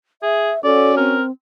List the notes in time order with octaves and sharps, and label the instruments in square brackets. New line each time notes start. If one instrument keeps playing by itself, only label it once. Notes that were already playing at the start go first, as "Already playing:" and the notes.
[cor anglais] G#4 [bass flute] E5
[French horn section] C#4 F#4 [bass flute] A4 [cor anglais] D5
[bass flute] C4 [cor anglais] A#4